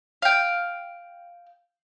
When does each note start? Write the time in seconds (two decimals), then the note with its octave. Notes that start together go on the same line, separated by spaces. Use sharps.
0.22 F5 G5